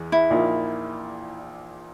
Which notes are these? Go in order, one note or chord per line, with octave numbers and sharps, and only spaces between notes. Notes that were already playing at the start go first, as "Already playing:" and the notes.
Already playing: E2 E3 G#3
E4
A#1 A#2 A#3 D#4